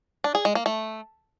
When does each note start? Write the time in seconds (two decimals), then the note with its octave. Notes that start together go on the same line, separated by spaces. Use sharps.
0.24 D4
0.35 G#4
0.45 G#3
0.55 A#3
0.66 A3